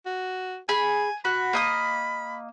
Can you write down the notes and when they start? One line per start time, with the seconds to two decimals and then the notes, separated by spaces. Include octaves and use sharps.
0.06 F#4
0.69 G#4 G#5 B5
1.25 F#4 B5
1.53 A#3 D#5 D#6